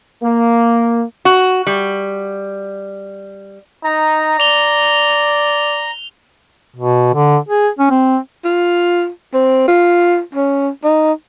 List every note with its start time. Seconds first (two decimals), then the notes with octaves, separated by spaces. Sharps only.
0.23 A#3
1.25 F#4
1.67 G3
3.84 D#4 A#5
4.40 D5 F7 G7
6.76 B2
7.14 D3
7.49 G#4
7.79 C#4
7.90 C4
8.44 F4
9.34 C4
9.68 F4
10.35 C#4
10.84 D#4